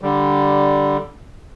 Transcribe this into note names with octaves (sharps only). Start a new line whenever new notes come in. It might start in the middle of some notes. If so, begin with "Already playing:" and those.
D3 G3